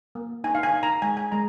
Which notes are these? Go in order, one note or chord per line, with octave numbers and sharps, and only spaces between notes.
A#3
D#4 G#5
F5
G#5
D#4
A#5
G#3 G#5
G#5
G#3 A#5